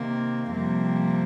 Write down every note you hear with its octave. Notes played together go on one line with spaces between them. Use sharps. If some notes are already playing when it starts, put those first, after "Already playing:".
Already playing: C3 D#3 A#3
F2 C3 G3 A#3